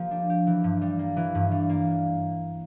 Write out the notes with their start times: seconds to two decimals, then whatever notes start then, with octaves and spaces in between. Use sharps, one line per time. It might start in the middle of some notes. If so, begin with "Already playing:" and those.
Already playing: F3 A#3 G4
0.11 D4
0.30 G4
0.47 E3
0.64 G2
0.82 G3
0.99 A#3
1.17 E3
1.35 G2
1.51 G3
1.69 A#3